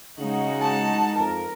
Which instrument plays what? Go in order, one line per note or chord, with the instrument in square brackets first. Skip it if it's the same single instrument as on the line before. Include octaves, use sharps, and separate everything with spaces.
[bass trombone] C#3 [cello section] G#3 D#4 F#4
[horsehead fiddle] A5
[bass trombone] F2 [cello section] A#4